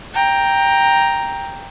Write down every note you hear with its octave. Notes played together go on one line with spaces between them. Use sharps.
G5 A#5